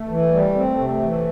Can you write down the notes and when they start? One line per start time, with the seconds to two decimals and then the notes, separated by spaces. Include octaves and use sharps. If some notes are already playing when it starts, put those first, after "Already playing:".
Already playing: A3
0.09 E3
0.32 G3
0.54 C4
0.78 C3
1.02 E3